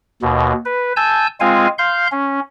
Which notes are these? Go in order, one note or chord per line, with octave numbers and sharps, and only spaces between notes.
D#2 B2
B4
G#5 A5 E6 G6
G#3 C4 F4 F5 G#5
F5 C6 G6
C#4